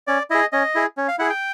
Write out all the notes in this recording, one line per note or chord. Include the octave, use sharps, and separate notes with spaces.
C#4 D5
E4 G#4 D#5
C#4 D#5
E4 G#4
C#4
F5
E4 G#4 F#5
G5